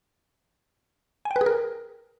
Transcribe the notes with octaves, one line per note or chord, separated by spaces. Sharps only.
G#5
G5
B4
G#4
A#4